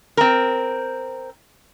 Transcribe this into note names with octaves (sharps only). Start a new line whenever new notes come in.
C4 A#4